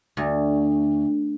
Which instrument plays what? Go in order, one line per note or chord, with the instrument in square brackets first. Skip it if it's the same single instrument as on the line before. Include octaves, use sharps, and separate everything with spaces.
[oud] D2